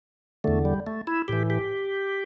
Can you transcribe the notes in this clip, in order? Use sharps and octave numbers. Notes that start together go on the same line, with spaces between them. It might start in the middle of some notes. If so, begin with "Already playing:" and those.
E2 D3 A3
G3
A3
E4
A2 E3 G4
G4